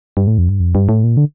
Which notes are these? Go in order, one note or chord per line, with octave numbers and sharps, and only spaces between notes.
G2
A2
F2
G2
F2
G2
A2
A#2
D3